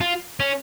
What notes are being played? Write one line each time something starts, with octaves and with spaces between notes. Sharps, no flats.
F4
C#4